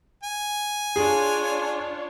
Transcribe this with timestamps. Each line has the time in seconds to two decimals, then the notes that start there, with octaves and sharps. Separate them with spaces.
0.23 G#5
0.96 D4 F4 G#4 C#5